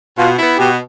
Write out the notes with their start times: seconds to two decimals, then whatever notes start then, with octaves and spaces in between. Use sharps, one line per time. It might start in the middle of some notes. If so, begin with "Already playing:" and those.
0.18 B2 F4
0.38 B3 E4
0.58 B2 G4